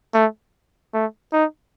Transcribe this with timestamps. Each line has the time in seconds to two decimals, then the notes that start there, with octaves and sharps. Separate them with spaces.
0.14 A3
0.94 A3
1.33 D#4